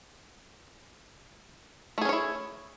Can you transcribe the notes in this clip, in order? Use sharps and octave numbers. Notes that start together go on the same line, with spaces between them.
A3 C#4 E4 G#4 C#5